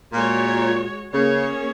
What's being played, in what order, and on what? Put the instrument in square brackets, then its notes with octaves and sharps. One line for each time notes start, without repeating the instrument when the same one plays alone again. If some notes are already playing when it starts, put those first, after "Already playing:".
[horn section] A#2 [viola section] G#3 F#4 C#5
[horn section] C#3 [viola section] A#3 C#4 G#4 C#5